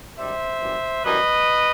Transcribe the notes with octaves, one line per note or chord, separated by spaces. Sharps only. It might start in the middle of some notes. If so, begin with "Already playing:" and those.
F#2 D#3 G3 C5 E5
F#2 E3 G3
F#2 E3 G3 B4 D#5